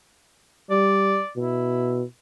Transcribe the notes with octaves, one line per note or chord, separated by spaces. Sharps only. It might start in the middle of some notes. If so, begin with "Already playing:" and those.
G3 D5
B2 E4